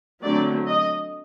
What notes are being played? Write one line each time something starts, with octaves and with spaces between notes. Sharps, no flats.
D3 F#3 A3 C4 D5
D#5